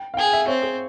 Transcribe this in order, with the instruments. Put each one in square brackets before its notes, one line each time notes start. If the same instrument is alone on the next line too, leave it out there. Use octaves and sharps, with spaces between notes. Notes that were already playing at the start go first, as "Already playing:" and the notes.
Already playing: [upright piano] G5
F5
[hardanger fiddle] G#4 [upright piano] G5
[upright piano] E5
[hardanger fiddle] C4 [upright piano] C#5
[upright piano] G#4